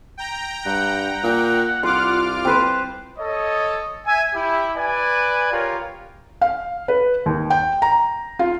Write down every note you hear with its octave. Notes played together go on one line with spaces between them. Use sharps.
G5 A#5
G2 F#5
A#2
C2 F4 C6 D6 F6
C4 B4 C5
A4 C#5 D#5
E5 G#5
E4 G4
B4 D5 G#5
F4 G4 A#4 C#5
F5
B4
D#2
G5
A#5
F4